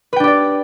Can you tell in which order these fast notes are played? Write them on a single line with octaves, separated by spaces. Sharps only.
B4 G5 D4 G4 D5